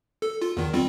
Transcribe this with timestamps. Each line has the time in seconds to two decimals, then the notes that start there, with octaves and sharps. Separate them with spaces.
0.22 A4
0.42 F4
0.57 E2 D#3
0.74 G3 C4 F4